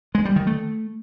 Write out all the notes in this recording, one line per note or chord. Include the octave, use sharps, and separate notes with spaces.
G#3
G3
D#3
A3